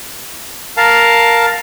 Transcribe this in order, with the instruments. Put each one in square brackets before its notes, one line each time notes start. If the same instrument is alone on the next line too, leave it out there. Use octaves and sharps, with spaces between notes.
[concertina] A#4 F5 A5